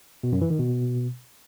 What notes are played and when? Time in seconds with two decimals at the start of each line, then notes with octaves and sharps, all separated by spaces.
0.23 B2
0.32 F#2
0.41 E3
0.50 D#3
0.59 B2